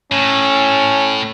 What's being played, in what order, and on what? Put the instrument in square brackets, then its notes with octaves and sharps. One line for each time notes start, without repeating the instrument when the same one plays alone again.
[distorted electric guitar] A2 [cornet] C#4